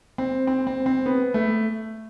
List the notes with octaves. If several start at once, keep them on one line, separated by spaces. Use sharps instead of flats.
C4
C4
C4
C4
B3
A3